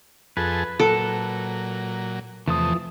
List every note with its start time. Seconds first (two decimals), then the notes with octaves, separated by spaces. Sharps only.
0.37 F2 G#4 A4 B4
0.80 A#2 F#3 A4
2.48 E2 C3 E3 F3 A3 D#6